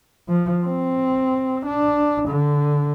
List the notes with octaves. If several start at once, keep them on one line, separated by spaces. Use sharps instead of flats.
F3
C4
D4
D3